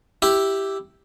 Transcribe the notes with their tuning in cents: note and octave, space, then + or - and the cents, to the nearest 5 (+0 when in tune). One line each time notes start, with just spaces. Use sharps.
E4 +0 G4 +0